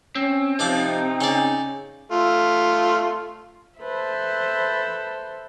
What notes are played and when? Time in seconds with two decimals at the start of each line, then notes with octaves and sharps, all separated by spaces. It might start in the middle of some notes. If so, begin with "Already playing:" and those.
0.15 C4 C#4
0.59 C3 F3 D4 D#4 D6
1.21 C#3 C#4 D5
2.11 A3 F4
3.81 A4 B4 C5 E5